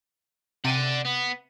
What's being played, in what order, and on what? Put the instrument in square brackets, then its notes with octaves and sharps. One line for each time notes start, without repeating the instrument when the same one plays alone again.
[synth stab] C3 D#7 [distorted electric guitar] D5 F#5
[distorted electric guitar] B3